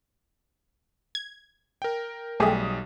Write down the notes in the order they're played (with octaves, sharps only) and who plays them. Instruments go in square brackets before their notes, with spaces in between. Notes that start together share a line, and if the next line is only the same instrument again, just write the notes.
[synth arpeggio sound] G#6
[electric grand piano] A#4 G5
[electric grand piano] B1 G3 D#6 [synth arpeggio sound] A3 G4 G#4